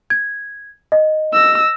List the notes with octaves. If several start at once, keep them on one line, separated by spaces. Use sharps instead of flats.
G#6
D#5
E6 A#6